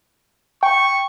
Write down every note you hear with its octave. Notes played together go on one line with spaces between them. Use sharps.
G5 C#6